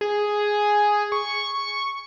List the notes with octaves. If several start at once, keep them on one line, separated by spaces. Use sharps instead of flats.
G#4
C#6